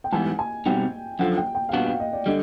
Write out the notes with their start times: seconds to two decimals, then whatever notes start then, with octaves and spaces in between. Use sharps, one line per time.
0.04 G5
0.13 G#2 E3 G3 B3 G#5
0.39 G#5
0.66 B2 G3 C4 D#4 F#4 G5
1.19 F#2 D3 F3 F#5
1.37 G5
1.55 G5
1.69 F5
1.72 A#2 G3 B3 D4 F#4 F#5
1.86 F5
2.00 D#5
2.13 D5
2.26 D3 G3 D#5